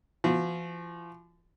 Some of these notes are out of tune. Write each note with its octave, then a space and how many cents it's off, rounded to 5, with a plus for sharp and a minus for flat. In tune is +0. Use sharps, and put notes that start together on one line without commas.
F3 -40 F#4 -35